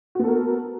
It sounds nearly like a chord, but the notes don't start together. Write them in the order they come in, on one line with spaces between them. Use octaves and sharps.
F#4 B3 A4 A#4